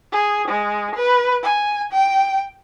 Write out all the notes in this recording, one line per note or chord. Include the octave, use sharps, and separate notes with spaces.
G#4
G#3
B4
G#5
G5